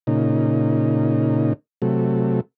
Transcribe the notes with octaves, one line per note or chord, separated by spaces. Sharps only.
A#2 C#3 D#4
C3 F#3 A3